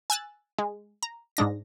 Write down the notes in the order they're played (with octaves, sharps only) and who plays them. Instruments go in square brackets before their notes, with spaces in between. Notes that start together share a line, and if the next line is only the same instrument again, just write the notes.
[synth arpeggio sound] G#5 E6 F#6 A6
G#3
A#5
G#2 G#3 D4 A#6